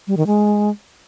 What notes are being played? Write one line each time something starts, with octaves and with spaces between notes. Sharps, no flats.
G3
D#3
G#3